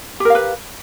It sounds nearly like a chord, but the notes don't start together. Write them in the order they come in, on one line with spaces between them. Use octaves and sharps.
G4 A#4 F5 B4